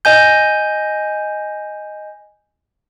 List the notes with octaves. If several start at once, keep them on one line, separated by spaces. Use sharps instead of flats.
D#5 G#5 G6